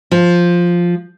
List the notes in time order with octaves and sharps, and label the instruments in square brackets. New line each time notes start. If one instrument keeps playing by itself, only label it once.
[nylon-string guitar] F3